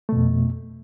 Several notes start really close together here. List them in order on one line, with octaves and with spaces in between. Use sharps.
A3 B2 F2